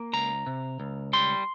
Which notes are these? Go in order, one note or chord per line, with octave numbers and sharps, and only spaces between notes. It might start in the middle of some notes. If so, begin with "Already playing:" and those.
Already playing: A#3
C#2 A#5
C3
C#2
G3 C6